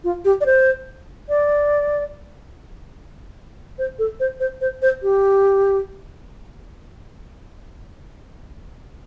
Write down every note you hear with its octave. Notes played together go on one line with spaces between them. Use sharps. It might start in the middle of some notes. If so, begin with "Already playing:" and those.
F4
G4
D5
C5
D5
C5
A4
C5
C5
C5
C5
G4